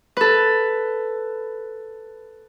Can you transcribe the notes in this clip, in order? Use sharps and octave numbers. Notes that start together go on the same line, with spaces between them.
A4 B4